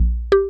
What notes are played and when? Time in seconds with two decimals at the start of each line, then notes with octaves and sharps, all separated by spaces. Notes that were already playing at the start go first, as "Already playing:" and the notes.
Already playing: A#1
0.32 G4